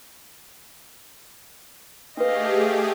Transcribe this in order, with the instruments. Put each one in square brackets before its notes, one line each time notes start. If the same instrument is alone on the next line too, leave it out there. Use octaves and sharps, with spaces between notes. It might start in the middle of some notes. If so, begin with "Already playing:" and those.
[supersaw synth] A3 G4 G#4 [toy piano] D4 B4 [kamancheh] D#5 F5